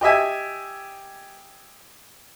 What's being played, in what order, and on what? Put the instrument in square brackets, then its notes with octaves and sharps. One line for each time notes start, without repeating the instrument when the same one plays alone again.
[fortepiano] G4 D#5 E5 G#5